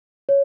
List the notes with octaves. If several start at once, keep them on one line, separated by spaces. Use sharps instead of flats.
C#5